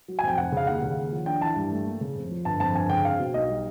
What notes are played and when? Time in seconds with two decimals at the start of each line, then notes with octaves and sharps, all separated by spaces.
0.08 F#3
0.19 G#5
0.23 F2 G5
0.38 F1 F#5
0.52 C#3 F5
0.67 D#2 F#5
0.82 C#3
0.97 D#2
1.12 F3
1.26 D4 G5
1.42 E3 A5
1.56 G2
1.72 A3
1.86 A#3
2.01 C#3
2.16 F2
2.31 F3
2.45 G1 A5
2.60 F2 A5
2.75 G1 G#5
2.90 C#3 G5
3.05 C4 F5
3.19 B2
3.34 B1 D#5
3.49 G3